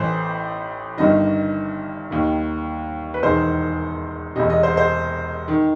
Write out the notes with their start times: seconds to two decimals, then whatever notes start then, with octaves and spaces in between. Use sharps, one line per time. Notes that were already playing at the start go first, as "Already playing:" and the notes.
Already playing: A1 A2 E3 C5
0.97 G1 G2 D#3 D#5
2.11 D#2 D#3
3.14 B4
3.23 E1 E2 D#3 C5
4.36 E1 E2 C3 D#5
4.50 D#5
4.63 C5
4.77 C5
5.48 D#3